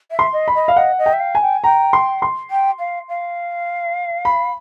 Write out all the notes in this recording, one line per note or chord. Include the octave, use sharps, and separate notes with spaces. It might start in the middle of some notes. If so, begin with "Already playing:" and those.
E5
C6
D#5
B5
D#5
F5
D#5 F#5
D#5
G5
E5
F5
G#5
G5
G5 A#5
C6
C6
G5
F5
F5
B5